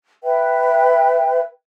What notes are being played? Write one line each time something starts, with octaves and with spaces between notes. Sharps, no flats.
B4 E5 G5